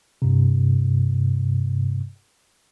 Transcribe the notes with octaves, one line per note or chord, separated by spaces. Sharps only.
G2 C3